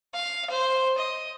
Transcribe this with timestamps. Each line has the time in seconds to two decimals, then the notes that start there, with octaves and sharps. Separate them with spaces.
0.14 F5
0.50 C5
0.98 D#5